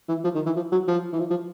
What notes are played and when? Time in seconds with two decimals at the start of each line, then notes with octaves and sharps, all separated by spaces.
0.09 E3
0.24 F3
0.35 D#3
0.46 E3
0.56 F3
0.72 F#3
0.88 F3
1.13 E3
1.20 F3
1.30 F3